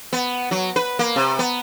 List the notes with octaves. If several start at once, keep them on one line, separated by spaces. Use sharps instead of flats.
B3
F#3
B4
A#3
C3
B3